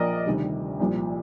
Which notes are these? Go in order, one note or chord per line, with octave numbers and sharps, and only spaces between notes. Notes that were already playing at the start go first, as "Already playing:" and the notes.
Already playing: A#1 A#2 F3 A#4 D5 D#5
D2 C3 D#3 G3
C2 A#2 F3